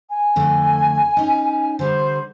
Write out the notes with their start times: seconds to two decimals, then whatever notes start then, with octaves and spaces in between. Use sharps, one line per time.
0.10 G#5
0.36 F2 D3 A3
1.17 C#4 D#4
1.79 D3 G3 C5